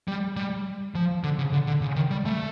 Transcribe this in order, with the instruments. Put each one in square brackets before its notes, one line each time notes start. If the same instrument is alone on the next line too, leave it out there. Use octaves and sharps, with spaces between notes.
[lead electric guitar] G3
G3
F3
D3
C#3
D3
D3
C#3
D#3
G3
A3